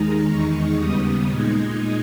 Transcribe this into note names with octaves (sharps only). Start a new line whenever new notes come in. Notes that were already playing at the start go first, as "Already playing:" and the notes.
Already playing: D#2 D#3 G#3 D#4 A#5
E2 D#3 G#3 D#4 C#6
D#2 C#3 G3 B3 D#6
A#2 G#3 D#4 G#6